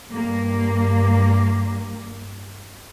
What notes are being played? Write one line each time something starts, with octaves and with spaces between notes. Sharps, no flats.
G2 A#3